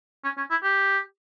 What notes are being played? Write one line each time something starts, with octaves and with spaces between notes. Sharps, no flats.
C#4
C#4
E4
G4